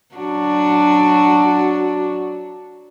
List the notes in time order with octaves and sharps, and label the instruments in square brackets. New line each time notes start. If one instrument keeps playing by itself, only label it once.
[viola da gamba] F#3 D4 F#4